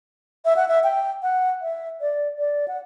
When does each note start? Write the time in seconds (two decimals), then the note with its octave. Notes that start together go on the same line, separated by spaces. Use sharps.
0.45 E5
0.56 F#5
0.68 E5
0.84 G5
1.23 F#5
1.62 E5
2.01 D5
2.39 D5
2.68 F#5